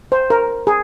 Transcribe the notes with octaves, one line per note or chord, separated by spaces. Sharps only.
C5
A#4
G#4